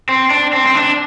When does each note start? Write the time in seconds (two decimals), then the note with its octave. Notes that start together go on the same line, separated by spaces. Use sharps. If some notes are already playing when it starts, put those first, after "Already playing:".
0.09 C4
0.31 D4
0.53 C4
0.67 C4
0.75 D4